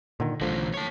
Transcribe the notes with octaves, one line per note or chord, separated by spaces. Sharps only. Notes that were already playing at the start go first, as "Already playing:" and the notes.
A#2 D3 D#3
B1 D3 E3 F3 A3
C#5 A5